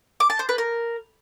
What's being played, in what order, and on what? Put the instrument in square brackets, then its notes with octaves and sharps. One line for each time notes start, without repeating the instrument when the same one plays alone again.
[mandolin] D6
A5
C5
B4
A#4